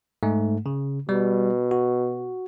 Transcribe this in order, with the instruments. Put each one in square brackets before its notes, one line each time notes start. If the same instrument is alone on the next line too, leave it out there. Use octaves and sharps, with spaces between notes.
[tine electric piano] G#2 A3
C#3
[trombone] B2 [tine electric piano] G3
[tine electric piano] F#4